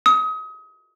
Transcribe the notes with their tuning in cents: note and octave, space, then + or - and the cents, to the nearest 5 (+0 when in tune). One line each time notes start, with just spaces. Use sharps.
D#6 +30